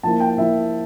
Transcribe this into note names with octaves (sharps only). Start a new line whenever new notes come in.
F3 A#3 E4 A5
G5
F3 A#3 E4 E5